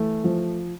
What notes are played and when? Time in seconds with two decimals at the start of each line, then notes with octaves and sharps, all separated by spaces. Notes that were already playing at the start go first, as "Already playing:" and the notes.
Already playing: E3 A3
0.24 F3